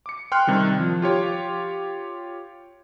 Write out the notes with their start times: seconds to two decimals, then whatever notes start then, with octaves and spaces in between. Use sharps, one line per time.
0.06 D6 C#7
0.32 G5 C6 F6 F#6
0.47 C3 D#3 G3
0.80 F3
1.02 F4 G4 C#5